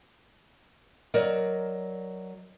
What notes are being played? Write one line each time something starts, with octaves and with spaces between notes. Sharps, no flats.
F#3 A#4 D5 D#5